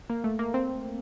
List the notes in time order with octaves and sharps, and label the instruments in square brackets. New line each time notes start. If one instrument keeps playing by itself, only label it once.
[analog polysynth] A#3
A3
A#3
C4